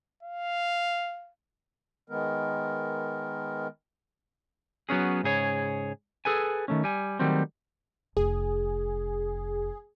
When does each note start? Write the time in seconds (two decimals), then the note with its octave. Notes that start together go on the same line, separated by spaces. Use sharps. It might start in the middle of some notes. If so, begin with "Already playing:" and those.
0.23 F5
2.10 D#3 G#3 B3 A#4
4.89 F#3 B3 C#4 G#4
5.23 G#2 C#3 G#4 C#5
6.25 G#4 A4 B4 G#5
6.68 D#3 A3 C#4
6.84 G3 G#5
7.19 D#3 F#3 G3 A3 C4
8.17 F1 G#4